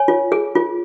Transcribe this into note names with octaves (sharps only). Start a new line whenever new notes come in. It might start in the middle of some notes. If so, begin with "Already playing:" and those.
Already playing: C#5 G#5
F4
G#4
F4